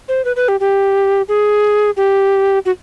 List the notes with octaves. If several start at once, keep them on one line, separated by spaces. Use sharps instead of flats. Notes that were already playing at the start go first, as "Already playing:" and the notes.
C5
B4
B4
G4
G4
G#4
G4
F#4